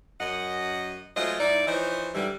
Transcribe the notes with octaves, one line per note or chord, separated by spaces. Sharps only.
F#2 D#5 F#5
F#3 G#3 A3 F4 C5 D#5
G#2 D#4 E4 D5
E3 F3 D#4 C5 C#5 D#5
G#2 D3 E3 G3